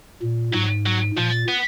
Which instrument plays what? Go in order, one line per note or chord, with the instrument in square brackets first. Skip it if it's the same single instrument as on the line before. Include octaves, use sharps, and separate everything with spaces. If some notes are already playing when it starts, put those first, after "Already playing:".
[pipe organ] A#2
[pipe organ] G#2 [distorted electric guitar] F#3
[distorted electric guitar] F#3
[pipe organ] A#2 [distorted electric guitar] F3
[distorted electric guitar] B3